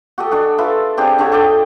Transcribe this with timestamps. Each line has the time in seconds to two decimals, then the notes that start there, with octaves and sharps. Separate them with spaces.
0.18 F#4 G4 A4 D#5
0.31 D4 F#4 G#5
0.58 F4 A4 B4 E5
0.97 C4 D4 G4 G#4
1.18 D3 D4 G4 C#5
1.32 A4 D5 D#5 G5